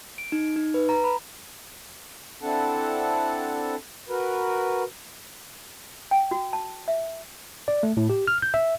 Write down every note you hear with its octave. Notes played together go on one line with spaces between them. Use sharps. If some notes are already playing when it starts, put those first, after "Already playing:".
D7
D#4
D#4
B4
A#5
B5
C4 D4 E4 A4 F#5 A5
F#4 A#4 B4
G5
F#4
A5
E5
D5
A3
A2
G4
F6
G6
E5